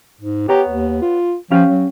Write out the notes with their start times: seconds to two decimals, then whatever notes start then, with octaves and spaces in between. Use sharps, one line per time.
0.21 G#2
0.48 B3 G4 C#5 A#5
0.69 D#2
1.02 F4
1.51 F3 C#4 G4 F5
1.70 F#3